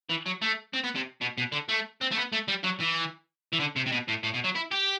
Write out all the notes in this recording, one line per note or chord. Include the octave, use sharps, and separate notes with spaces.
E3
F#3
A3
C4
B3
C3
B2
B2
D3
A3
C4
A3
B3
A3
G3
F#3
E3
E3
D3
C3
C3
B2
A2
A2
B2
F#3
E4
G4